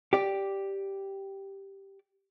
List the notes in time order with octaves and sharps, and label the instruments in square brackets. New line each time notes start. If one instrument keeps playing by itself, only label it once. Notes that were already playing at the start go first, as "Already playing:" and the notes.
[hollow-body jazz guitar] G4 D5